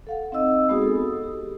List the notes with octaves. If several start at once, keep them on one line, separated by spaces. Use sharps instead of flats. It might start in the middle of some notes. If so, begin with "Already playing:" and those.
A4 F5 F#5
C4 D#4 D#5 E6
G#3 B3 D#4 F#4 G#4 D#6
A4
G4